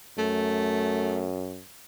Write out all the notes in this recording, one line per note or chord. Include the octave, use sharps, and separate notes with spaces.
F#2 A3